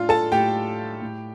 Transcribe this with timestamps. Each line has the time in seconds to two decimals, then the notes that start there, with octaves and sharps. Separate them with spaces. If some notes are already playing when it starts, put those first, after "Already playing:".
Already playing: A2 D4 F4 F5
0.09 A4 A5
0.32 A2 G4 G5
1.02 A2